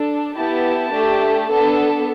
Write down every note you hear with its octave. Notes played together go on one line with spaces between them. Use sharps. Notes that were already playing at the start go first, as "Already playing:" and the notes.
Already playing: D4 A4
B3 E4 G4 A5
A3 D4 G4
B3 D4 A4